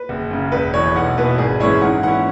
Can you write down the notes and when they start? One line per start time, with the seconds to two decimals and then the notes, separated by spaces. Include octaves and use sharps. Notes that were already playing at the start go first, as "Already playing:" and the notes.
Already playing: B4
0.09 F#1
0.31 F#2 C#3
0.52 E1 B4
0.73 E2 E3 C#5
0.96 B1 F#5
1.17 B2 B3 E4 B4
1.38 G#1 G#4
1.60 F#2 E3 G#3 E4 C#5
1.81 G#2 F#5
2.03 E3 C#4 E4 F#5